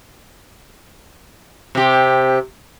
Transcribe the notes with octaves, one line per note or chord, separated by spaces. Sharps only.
C3 G4